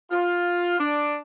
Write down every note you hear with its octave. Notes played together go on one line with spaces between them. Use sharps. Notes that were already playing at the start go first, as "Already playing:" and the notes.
F4
D4